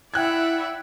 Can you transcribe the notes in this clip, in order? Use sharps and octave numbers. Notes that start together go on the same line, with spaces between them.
E4 D5 E5 F#5 G5 F#6 G#6